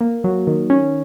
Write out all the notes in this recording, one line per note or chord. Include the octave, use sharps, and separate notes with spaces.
A#3
F#3
D#3
C#4